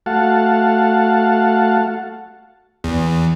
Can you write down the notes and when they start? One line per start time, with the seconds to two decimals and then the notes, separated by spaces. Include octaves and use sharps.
0.06 A3 F#4 F5 F#5 A5
2.84 E2